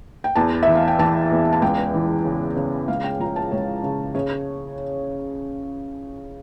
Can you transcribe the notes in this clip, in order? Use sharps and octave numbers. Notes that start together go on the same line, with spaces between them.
G5
E2 A5
E3 E5
F5
G5
E3 A5
E2
A5
C#2 G5
E3
C#3
C#3
C#2 F5
G5
F3 A#5
A5
C#2 C#5
C#3
C#3 C#5